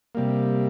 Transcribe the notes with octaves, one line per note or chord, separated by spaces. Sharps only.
C3 G3 A#3